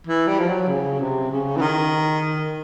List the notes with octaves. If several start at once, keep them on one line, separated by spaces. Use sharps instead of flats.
E3
G3
F3
F#3
C#3
C3
C#3
E3
D#3